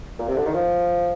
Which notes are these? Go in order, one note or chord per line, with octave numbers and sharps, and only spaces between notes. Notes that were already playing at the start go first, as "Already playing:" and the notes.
A#2
C3
D3
D#3
F3